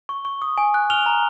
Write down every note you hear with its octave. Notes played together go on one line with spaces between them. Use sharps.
C#6
C#6
D#6
G#5
F#6
F6 F7 G7
A#5